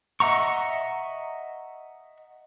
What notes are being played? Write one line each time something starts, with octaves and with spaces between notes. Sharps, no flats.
D#5 E5 F#5 A#5 C#6